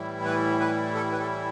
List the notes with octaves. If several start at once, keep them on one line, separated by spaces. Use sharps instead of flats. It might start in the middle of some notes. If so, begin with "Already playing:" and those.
Already playing: A2 E3 G3 E4
B4
B4
A4
B4
A4